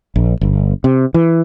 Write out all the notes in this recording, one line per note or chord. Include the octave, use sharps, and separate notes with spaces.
A#1
G1
C3
E3